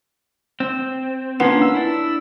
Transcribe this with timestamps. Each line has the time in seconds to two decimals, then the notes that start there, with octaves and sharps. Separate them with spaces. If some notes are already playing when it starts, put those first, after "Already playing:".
0.60 C4
1.40 A#3 B3 C#4 D4 F4
1.61 E6
1.74 D4 E4